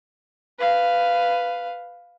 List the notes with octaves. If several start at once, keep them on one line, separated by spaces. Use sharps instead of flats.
B4 F5